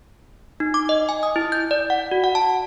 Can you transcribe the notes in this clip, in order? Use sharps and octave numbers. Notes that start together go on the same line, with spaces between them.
D#4
D6
D#5
G#5
D#6
E4
G6
D5
F#5
F#4
F#5
A5